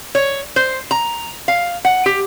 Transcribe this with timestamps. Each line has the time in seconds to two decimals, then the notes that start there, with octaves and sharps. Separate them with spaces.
0.15 C#5
0.56 C5
0.91 A#5
1.48 F5
1.85 F#5
2.06 G4